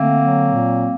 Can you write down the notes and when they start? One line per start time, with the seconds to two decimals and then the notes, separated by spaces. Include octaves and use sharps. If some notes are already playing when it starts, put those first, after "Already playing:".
Already playing: D3 A3 A#3 C4
0.22 F#3
0.52 A#2